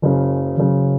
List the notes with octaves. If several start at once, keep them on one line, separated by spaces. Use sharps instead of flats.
F#1 F#2 C#3
F#1 F#2 C#3